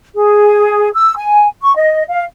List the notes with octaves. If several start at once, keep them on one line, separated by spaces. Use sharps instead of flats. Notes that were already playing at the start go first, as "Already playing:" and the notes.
G#4
E6
G#5
C#6
D#5
F5